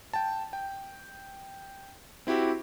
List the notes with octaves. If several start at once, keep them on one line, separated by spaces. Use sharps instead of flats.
G5 A5
G5
C4 E4 F#4 G4